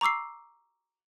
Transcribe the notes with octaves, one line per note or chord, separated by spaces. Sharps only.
A#5 C#6 D6 E6 C7